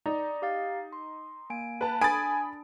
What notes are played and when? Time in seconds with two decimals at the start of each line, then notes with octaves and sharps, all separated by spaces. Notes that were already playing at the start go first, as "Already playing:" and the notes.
0.06 D#4 D5 A#5
0.42 G4 F5 A6
0.93 C6
1.50 A#3 G#5 D7
1.81 B4 A5
2.01 D4 G#5 B5 D#6 A6 D7